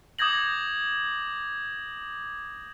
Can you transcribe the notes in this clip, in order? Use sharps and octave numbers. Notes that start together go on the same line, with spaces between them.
D6 D#6 G6 G#6 A#6 F#7